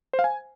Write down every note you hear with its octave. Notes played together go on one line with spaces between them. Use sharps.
C5
F5
G#5